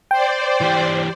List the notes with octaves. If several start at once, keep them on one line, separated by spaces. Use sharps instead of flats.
C5 D5 G5
E3 G4